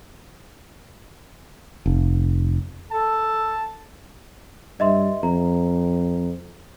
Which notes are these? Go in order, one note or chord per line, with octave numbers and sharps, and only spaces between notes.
F1
A4 A5
G2 D#5 E5 C6
F2 A#5